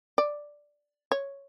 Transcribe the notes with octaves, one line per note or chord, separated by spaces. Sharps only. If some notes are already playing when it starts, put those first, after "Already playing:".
D5
C#5